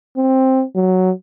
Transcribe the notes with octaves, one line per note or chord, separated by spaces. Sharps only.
C4
F#3